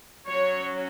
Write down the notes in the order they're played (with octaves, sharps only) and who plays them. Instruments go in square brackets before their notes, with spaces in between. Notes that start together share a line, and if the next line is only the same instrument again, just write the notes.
[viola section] F#3 C#4 C#5